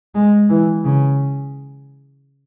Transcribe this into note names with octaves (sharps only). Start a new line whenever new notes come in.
G#3
E3
C#3